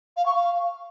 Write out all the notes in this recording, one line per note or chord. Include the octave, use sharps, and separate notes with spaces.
F5
C#6
F5